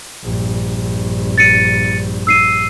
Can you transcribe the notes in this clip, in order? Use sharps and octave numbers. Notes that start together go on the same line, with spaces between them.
A#1 G2
A6 C#7 D#7
E6 C7 D#7